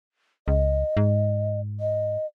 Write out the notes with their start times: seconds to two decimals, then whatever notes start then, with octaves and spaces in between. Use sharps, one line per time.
0.48 C#2 D#5
0.97 G#2
1.80 D#5